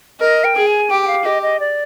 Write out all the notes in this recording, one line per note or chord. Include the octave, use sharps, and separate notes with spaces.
A#4 D#5
G5
G#4
G#5
G4 G5
G5
F5
G4 D#5
D#5
D5